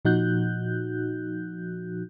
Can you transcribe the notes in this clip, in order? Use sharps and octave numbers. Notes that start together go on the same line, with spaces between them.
A#2 F3 D#4 F#4 F#6 G6